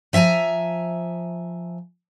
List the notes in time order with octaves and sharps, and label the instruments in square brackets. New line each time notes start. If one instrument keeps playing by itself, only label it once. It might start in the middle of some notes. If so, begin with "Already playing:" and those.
[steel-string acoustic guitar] F3 E5 F#5 G#5 A#5